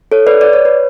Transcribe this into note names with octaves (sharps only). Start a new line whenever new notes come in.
A4 C#5
B4 D5
D5
C#5
B4